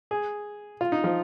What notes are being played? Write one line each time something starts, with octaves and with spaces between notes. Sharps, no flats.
G#4
F4
D#4
F3